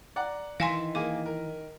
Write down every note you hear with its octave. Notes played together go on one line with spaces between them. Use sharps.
D5 F#5 A#5
D#3 E3 F5 G#5 C6 A#6 B6
A#3 G#4 D6 D#7
A#4